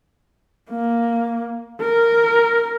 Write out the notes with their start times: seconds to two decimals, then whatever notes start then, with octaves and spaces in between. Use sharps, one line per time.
0.70 A#3
1.81 A#4